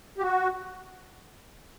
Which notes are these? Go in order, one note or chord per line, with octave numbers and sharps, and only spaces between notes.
G4
F#4